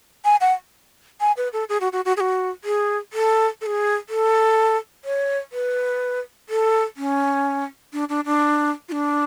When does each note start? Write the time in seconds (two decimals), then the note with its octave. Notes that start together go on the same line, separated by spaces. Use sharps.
0.25 G#5
0.41 F#5
1.21 G#5
1.37 B4
1.53 A4
1.69 G#4
1.81 F#4
1.92 F#4
2.05 F#4
2.17 G#4
2.20 F#4
2.64 G#4
3.13 A4
3.61 A4
3.66 G#4
4.09 A4
5.05 C#5
5.52 B4
6.49 A4
6.97 C#4
7.93 D4
8.09 D4
8.25 D4
8.89 F4
8.92 D4